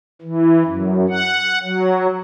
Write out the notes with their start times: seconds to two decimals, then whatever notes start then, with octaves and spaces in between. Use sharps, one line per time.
0.22 E3
0.65 F#2
1.09 F#5
1.63 F#3